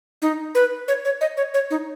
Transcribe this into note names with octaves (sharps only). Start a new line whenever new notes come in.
D#4
B4
C#5
C#5
D#5
C#5
C#5
D#4